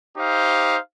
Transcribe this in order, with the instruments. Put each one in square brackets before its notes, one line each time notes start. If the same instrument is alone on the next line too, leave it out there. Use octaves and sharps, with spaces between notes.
[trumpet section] D#4 G4 C5 F5